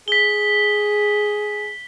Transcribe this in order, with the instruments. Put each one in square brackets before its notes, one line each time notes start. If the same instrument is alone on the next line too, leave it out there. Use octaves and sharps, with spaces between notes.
[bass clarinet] G#4 [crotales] B6 G7